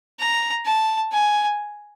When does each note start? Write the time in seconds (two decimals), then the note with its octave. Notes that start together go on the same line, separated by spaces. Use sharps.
0.19 A#5
0.66 A5
1.13 G#5